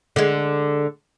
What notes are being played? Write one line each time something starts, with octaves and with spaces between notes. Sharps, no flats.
D3 G#3